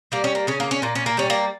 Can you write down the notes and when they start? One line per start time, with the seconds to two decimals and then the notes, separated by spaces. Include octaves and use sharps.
0.12 G3 A#3
0.24 C#4
0.35 A#3
0.47 C#3 C#4
0.60 A#3
0.71 C#4
0.82 A#2 A#3
0.95 C#4
1.06 A#3
1.17 G3 C#4
1.30 A#3